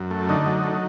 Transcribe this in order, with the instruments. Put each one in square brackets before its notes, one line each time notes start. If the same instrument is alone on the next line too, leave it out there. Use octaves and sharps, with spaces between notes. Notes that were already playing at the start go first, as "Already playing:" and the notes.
Already playing: [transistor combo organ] F#2
A3
D3 D#4
F#3
A3